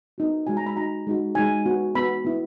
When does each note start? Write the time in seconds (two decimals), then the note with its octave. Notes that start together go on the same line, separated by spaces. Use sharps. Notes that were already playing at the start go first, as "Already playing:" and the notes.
0.18 B3 D#4 F#4
0.47 G#3 D#4 F#4 G#5
0.57 A#5
0.66 B5
0.76 G#3 D#4 F#4 A#5
1.07 G#3 D#4 F#4
1.35 G#3 D#4 F#4 G#5
1.66 B3 F#4
1.95 B3 F#4 B5
2.25 B3 E4